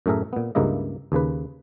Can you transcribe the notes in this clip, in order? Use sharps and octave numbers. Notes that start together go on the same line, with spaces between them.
F#2 A2 A3 G#4 A#4 E5
A#2 B3
C#2 G2 C#3 A#3 E4 D#5
D#2 C#3 B4